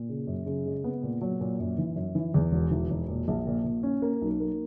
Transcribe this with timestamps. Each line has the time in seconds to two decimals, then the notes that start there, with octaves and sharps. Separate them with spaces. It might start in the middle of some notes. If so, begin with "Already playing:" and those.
Already playing: A#2
0.09 C#3
0.27 F#2
0.46 C#3
0.65 G#3
0.84 B3
1.03 A#2
1.21 F#3
1.41 A#2
1.59 F#2
1.78 E3
1.96 F#2
2.15 E3
2.34 E2
2.52 E1
2.71 E3
2.90 E1
3.09 A#2
3.28 A#1
3.47 A#2
3.64 A#2
3.83 C#4
4.02 A#3
4.22 B1
4.40 A#3